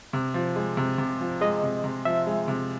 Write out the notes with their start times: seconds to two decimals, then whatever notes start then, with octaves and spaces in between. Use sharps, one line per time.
0.13 C3
0.34 F3
0.56 G#3
0.77 C3
0.98 C3
1.20 F3
1.41 G#3 D#5
1.63 C3
1.84 C3
2.05 F3 E5
2.27 G#3
2.48 C3